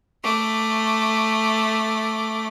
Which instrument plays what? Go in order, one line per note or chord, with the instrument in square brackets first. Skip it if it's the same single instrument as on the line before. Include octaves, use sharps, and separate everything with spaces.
[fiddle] A3 D6